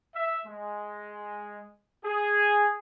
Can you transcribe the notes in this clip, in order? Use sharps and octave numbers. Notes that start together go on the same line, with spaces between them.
E5
G#3
G#4